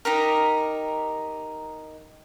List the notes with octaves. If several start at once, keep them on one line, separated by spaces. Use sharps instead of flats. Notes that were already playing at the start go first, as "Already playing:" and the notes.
D#4 G4 A#4